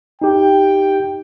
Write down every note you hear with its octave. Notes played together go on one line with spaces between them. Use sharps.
D#4 G4 G5